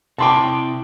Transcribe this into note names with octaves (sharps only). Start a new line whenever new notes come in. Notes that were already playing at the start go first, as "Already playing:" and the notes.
C3 E4 G5 A5 C6 D6